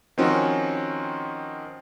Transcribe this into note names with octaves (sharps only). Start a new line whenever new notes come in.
D#3 F3 C4 C#4 F#4